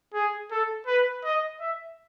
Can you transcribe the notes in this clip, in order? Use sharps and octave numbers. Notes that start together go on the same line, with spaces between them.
G#4
A4
B4
D#5
E5